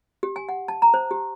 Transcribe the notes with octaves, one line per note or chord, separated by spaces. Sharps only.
G4
G#5
F#5
A5
A#5
C5
G4